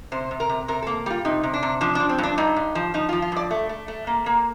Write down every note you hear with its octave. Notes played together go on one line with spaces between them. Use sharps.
C3 C5
C3
A#4
C3
C3 A#4
A#3 A4
G3 F4
C3 D#4
C3
D4
C3
F3 D4
F3 D4
C4
G2 D4
G2 D#4
G2
F3
F3 D#4
F3 F4
F4
G2 D5
A3
A3
A3
A#3
A#3